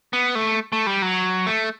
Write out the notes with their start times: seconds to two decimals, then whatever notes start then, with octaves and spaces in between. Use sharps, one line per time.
0.13 B3
0.35 A3
0.72 A3
0.87 G3
1.02 F#3
1.47 A3